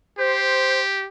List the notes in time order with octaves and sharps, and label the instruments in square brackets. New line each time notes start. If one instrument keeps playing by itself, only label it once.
[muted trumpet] G4 [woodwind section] C5